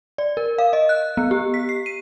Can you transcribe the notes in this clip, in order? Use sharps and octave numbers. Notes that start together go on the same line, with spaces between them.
D5
A#4
F5
D#5
F#6
B3
G4
B6
C7
D#7